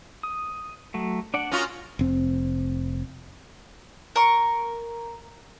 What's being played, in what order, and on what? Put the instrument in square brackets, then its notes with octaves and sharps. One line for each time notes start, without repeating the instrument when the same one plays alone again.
[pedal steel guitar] D#6
F#3 A3
D4 D5 F#5
[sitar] C#4 F4 F#4 [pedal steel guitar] A#4 D#6
[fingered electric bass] F1 C4
[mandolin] A#4 C#6